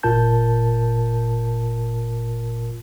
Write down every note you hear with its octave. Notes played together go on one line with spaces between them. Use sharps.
G1 A#2 F4 A#4 A5 G6